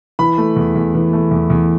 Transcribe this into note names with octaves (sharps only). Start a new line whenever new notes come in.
E3 B5
A3
E2
E2
E3
A3
E2
E2